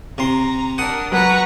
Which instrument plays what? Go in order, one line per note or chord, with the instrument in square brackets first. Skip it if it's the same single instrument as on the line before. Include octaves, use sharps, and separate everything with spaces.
[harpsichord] C3 C6 [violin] A#5
[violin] D4 A#4 [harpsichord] F#5 D#6
[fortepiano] F#3 [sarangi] B4 [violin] A#5 C#6